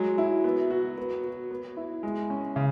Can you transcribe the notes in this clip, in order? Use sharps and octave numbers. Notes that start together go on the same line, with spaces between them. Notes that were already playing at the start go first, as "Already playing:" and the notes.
Already playing: F#3 G#3
E4
B3
F#4
B3
F#4
B3
E4
G#3
C#4
C#3